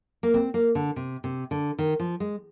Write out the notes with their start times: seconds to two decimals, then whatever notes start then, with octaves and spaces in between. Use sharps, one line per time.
0.23 A#3
0.34 C4
0.54 A#3
0.75 D3
0.96 C3
1.24 C3
1.51 D3
1.79 D#3
2.00 F3
2.20 G#3